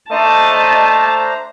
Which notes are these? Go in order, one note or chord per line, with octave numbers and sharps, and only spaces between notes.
A3 D4 C5 D#5 A5 A#5